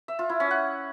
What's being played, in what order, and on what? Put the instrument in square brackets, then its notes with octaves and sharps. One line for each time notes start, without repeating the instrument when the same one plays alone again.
[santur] E5
F4
E4
C#4
F#5